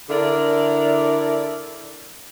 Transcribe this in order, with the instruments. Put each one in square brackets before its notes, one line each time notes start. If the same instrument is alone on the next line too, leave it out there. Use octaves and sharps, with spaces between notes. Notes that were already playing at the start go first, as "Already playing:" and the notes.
[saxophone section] D3 D4 E4 A#4 D5